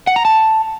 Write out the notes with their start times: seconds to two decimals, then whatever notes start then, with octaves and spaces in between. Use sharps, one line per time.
0.07 F#5
0.16 A#5
0.25 A5